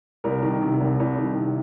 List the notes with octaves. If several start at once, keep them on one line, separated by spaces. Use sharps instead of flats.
C2 A#4
D#3
C3
C2
C2
D#3
C3